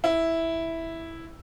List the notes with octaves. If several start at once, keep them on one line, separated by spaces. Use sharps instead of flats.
E4